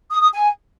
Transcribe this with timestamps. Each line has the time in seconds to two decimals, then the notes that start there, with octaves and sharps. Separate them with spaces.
0.10 D#6
0.21 D#6
0.32 G#5